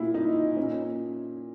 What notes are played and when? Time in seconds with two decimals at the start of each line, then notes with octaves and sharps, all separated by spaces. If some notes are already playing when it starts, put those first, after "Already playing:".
Already playing: A#2 E4
0.14 D#4
0.57 A#2 C#4